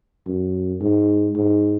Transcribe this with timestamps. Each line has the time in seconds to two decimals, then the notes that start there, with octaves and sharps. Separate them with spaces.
0.26 F#2
0.81 G#2
1.35 G#2